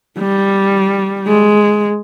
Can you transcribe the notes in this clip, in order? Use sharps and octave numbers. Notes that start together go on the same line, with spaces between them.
G3
G#3